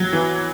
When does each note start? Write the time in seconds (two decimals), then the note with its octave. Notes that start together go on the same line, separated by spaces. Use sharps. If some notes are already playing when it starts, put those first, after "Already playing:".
Already playing: F#3
0.13 E3